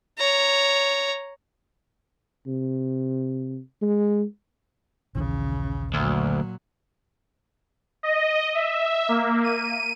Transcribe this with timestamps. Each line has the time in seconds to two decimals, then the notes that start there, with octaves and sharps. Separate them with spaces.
0.18 C#5 A#5
2.47 C3
3.82 G#3
5.15 A#1 D#2 C#3 E3
5.94 D2 A#2 F#3
8.03 D#5
8.55 E5
9.09 A#3
9.44 D#7